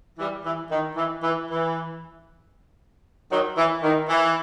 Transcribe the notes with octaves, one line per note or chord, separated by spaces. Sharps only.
E3 G3
E3
D#3
E3
E3
E3
D#3 F#3
E3
D#3
E3